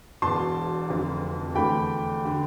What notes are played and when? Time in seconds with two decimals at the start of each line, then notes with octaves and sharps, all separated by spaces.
0.22 E1 E2 B2 A5 C6
0.89 F1 F2 D3
1.55 E2 D3 A3 G5 B5
2.25 D3